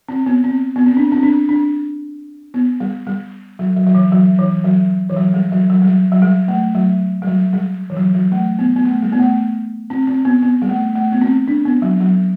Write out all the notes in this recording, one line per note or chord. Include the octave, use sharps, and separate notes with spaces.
C4
B3
C4
B3
C4
D4
C4
D4
D4
B3
G3
G3
F#3
F#3
F#3
E3
F#3
E3
F#3
E3
F#3
G3
F#3
F#3
G3
F#3
F#3
G3
A3
F#3
G3
F#3
G3
E3
F#3
F#3
A3
B3
B3
A3
G3
B3
A3
C4
C4
B3
B3
G3
A3
A3
B3
C4
D4
B3
F#3
F#3